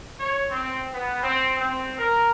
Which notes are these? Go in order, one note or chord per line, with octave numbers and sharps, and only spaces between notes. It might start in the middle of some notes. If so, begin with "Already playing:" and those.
C#5
C4
B3
C4
C4
A#4